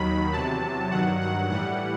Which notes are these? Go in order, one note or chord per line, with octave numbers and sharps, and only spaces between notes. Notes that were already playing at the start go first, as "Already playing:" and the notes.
Already playing: D#2 D#3 F#3 B5
E2 C3 F#3 A5
G2 D#3 F#3 F#5
F#5
A2 E3 G3 F#5